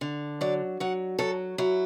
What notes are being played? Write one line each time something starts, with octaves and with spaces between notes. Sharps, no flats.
D3
F#3 D5
F#3 F#5
F#3 A4
F#3 E4